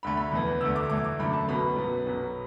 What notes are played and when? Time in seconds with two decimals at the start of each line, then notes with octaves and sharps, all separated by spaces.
0.03 D2 D3 A3 B5
0.17 B5
0.32 E2 E3 B3
0.61 D2 D3 A3 E6
0.76 D6
0.90 E2 E3 A3 D6
1.04 D6
1.19 F#2 D3 A3 B5
1.33 A5
1.48 B1 B2 B3 B5
1.76 F#2 F#3 B3
2.06 B1 B2 F#3 B3